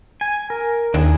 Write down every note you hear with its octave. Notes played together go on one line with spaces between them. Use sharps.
G#5
A#4
D#2 D4 E4 G#4